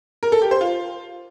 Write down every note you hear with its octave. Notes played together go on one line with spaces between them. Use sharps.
A#4
A4
G4
C5
F4